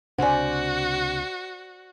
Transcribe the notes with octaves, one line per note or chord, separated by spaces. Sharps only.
C#2 C3 D4 F#4 C5 D5 F#5 G#5